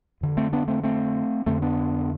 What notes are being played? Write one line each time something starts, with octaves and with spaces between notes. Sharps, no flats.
F2 D3
A3 C4
B3 D4
A3 C4
A3 C4
F2 D3 A3 C4
B3 D4